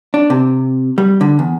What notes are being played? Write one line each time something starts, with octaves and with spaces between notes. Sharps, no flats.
D4
C3
G3
D3
E2